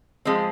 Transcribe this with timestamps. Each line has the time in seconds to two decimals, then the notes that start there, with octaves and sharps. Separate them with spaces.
0.25 F3 G#3 C4